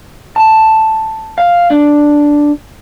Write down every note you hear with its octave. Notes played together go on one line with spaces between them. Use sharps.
A5
F5
D4